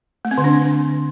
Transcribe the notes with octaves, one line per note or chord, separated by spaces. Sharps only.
A3
C4
D3
D4